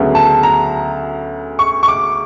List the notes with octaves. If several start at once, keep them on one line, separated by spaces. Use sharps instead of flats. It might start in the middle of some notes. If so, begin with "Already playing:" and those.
Already playing: D2 C#3 F#3 B3
A5
A#5
C#6
C#6
D6